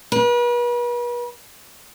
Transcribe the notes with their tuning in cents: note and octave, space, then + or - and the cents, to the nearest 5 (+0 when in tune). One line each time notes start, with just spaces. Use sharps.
B4 -40